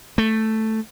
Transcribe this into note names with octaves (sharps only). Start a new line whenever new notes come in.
A3